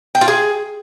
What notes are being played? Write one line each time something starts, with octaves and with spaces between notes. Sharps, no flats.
G5
F4
G#4